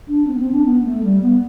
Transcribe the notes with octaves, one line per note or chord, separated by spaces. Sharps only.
D4
C4
B3
C4
D4
B3
A3
G3
B3